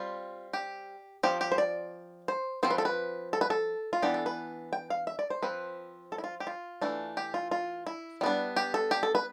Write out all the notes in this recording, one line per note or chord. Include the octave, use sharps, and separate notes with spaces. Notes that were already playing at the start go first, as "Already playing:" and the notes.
Already playing: G3 C4 F4
G4
F3 C4 G4
G4
C5
D5
C5
F3 C4 C5
B4
A4
B4
A4
B4
A4
F4
E3 B3 D4 G4
A4
B4
G5
F5
E5
D5
C5
F3 C4 B4
A4
E4
F4
G4
F4
E3 A3 D4
G4
F4
F4
E4
G3 B3 D4
G4
A4
G4
A4
B4